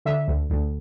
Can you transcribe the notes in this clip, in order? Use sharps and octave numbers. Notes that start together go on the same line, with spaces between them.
D3 E5
D2
D2